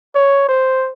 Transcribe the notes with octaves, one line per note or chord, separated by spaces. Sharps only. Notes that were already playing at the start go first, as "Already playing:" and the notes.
C#5
C5